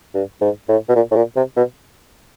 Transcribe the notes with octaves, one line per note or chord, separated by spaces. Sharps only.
G2
G#2
A2
B2
A#2
A2
A#2
C3
B2